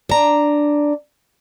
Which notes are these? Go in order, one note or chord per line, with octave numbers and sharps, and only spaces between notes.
D4 A#5